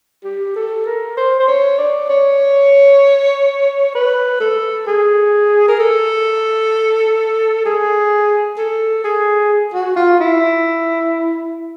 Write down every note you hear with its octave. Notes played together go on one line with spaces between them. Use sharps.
G4
A4
A#4
C5
C5
C#5
D5
C#5
B4
A4
G#4
A#4
A4
G#4
A4
G#4
F#4
F4
E4